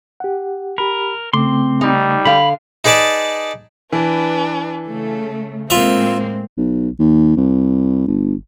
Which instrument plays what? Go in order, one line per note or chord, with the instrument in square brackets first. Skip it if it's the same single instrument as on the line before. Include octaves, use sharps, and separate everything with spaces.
[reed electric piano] G4 F#5
[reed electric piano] G4 B5 [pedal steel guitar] A#4
[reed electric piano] C#3 A3 D6 [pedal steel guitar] C4 C6
[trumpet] G3 [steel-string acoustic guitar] D#4
[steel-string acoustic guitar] D3 F5 [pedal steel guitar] B5
[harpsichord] D#4 G#4 B4 D5 A5
[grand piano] E3 [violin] D4 B4
[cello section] C#3 A3 [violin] A4
[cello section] A2 G#3 C4 [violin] A#3 C5 [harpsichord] F4 E5 [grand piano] F7
[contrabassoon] B1
D#2
C2
G1